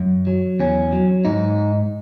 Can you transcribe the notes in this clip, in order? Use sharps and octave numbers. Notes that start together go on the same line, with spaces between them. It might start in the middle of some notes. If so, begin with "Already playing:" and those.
Already playing: F#2
F#3
E2 C#4
F#3
G#2 D#4